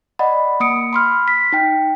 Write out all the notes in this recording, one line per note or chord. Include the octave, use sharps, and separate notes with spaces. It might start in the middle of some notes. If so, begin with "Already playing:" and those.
D5 D#5 F#5 B5
A#3 D#6 C#7 D7
B5 C6 F6
B6
D#4 G5